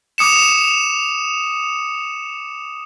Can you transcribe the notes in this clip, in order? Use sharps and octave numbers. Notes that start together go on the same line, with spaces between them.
D6 D#6 C#7 E7